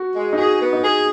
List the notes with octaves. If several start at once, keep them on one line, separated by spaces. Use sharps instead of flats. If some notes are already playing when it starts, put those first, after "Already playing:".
Already playing: F#4
G#3
D#4
F#4 G#4
B3
D#4
G#4